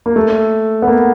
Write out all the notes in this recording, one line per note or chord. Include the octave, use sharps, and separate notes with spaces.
A#3
A3
B3
A#3